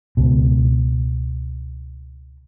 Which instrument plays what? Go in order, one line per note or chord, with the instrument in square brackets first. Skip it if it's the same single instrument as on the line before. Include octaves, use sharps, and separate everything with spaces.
[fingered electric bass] C#2 B2